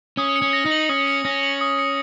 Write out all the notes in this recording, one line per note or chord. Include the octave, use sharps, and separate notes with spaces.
C#4 D#6
C#7
C#4
A#6
D#4
F#7
C#4 D#6
C#7
C#4 A#6
F#7
D#6
C#7